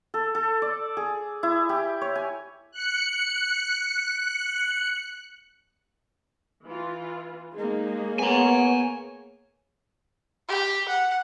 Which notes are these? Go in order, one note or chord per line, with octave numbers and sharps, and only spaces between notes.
A4
A4
D5
G#4
E4
G4
C#5
G#5
F#6 C#7
E3 F4
G#3 A#3 D#4 G#4
B3 C#5 G#5 A#5
G4
F#5